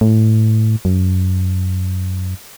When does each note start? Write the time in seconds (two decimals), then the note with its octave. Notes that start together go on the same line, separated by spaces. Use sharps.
0.01 A2
0.85 F#2